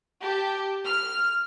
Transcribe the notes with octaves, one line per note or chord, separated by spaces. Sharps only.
G4 A5
F6